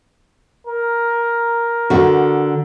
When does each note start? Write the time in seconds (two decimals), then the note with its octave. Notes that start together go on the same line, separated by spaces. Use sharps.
0.67 A#4
1.90 D3 F#4